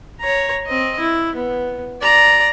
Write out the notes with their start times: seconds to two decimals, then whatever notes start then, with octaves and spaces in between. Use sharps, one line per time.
0.20 C#5 A#5
0.66 C4 D#5
0.99 E4
1.35 B3
2.01 D5 A#5